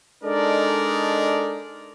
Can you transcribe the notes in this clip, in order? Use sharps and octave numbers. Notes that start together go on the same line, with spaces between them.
G#3 D4 D#4 A4 A#4 D5